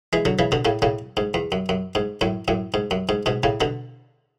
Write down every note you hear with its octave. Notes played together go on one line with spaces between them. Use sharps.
E3 G#3
D3 F#3
C#3 E3
B2 D3
A2 C#3
A2 C#3
G#2
E2
F#2
F#2
G#2
F#2 A2
F#2 A2
G#2
F#2
G#2
G#2 B2
A2 C#3
B2 D3